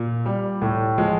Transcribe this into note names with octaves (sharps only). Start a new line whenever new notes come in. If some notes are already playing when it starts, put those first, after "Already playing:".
Already playing: A#2
G3
A2
F3 G#3